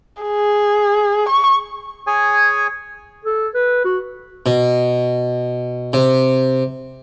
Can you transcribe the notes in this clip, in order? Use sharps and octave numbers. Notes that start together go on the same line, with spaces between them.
G#4
C#6
G#4 C#5 G#5
A4
B4
F#4
B2
C3